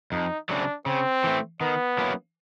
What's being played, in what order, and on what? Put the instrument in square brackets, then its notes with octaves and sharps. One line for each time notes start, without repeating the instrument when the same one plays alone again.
[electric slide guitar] F2 [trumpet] D#4
[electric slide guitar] C#3 F#3 A3 C4 [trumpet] D4
[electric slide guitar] C#3 [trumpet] C4
[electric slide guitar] E3 A3
[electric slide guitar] D#3 [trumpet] B3
[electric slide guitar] F#3 A#3 C#4 E4